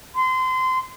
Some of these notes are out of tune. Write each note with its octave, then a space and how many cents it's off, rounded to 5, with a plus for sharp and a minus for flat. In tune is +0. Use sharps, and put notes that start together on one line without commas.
C6 -25